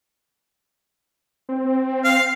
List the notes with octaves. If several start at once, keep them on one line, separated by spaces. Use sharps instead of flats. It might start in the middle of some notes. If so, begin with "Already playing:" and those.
C4
F5